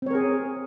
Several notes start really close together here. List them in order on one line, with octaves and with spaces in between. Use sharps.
C4 C#5 A#4 G#4